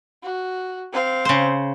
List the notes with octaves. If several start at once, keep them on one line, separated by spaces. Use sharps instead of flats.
F#4
C4 F5
C#3 C5